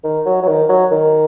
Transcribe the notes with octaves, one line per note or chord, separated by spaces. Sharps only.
D#3
F#3
F#3
D#3
F#3
D#3